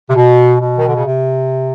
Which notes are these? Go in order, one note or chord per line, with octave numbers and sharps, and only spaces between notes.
C3
B2
B2
D#3
D3
C#3
C3